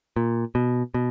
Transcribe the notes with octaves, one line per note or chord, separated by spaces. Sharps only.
A#2
B2
B2